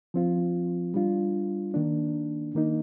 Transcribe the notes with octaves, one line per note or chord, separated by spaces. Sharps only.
F3 C4 F4
G3 D4 F4
D#3 A#3 D4
D#3 A#3 D#4